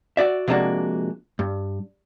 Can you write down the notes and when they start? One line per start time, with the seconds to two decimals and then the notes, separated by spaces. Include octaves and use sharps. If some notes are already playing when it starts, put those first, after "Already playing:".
0.17 F#4 D5 E5
0.48 C3 F3 G#3 A#3 D4 F#4
1.39 G2